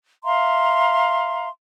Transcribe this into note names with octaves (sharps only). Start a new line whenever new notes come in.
E5 F5 A#5 C6